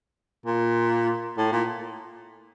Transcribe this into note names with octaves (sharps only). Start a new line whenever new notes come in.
A#2
A2
A#2